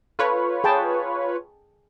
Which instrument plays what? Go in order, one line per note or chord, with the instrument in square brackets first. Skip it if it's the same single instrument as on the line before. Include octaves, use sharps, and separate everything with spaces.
[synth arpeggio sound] F4 B4 C#5 [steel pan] A4
[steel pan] G#4 G5 A5